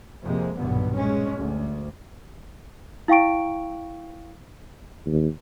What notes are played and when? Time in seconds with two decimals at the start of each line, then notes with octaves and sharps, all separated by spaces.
0.22 F2 C3 G#3 A#3
0.56 B1 G2 A#2 D3 B3
0.94 G#3 C#4
1.36 D2
3.08 E4 F5 G5 C#6 D7
5.06 D#2